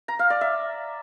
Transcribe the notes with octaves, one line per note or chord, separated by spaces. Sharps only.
A#5
F5
D5
E5